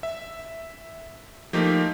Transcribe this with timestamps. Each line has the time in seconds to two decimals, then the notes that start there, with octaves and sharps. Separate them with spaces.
0.03 E5
1.53 F3 A3 A#3 D#4 G4